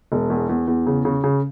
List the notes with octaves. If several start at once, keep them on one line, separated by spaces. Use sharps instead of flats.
E1
E2
E2
E2
C#3
C#3
C#3